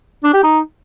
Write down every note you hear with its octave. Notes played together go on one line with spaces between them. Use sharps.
D4
G4
D#4